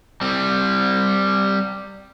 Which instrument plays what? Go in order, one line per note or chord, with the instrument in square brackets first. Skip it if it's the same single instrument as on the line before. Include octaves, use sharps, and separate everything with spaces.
[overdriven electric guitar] G3 C4